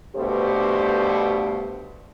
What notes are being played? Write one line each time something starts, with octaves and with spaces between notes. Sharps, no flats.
G2 B2 D3 A3 G4 C5